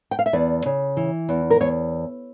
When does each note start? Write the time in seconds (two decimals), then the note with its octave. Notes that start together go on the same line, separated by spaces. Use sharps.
0.11 G5
0.19 F5
0.26 E5
0.33 E2 D5
0.66 C#3
0.97 E3
1.29 E2
1.50 A#4
1.60 E2 C#5